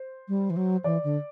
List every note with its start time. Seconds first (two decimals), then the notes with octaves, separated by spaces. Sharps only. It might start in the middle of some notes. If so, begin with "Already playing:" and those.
Already playing: C5
0.28 G3
0.50 E3
0.57 F#3
0.84 E3 D5
1.04 D3